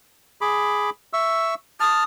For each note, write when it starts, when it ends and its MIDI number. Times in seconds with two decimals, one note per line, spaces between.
0.41 0.90 68
0.41 0.90 83
0.41 0.90 86
1.13 1.55 76
1.13 1.55 85
1.13 1.55 88
1.80 2.04 81
1.80 2.04 87
1.80 2.04 89